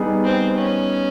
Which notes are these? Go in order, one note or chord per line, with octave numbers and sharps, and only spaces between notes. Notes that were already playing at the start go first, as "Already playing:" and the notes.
Already playing: G3 B3 D#4 G#4
C4
C#4